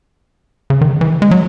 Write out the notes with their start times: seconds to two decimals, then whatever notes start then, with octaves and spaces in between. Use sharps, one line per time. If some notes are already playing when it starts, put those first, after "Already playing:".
0.70 C#3
0.81 D#3
1.01 E3
1.22 G#3
1.31 F#3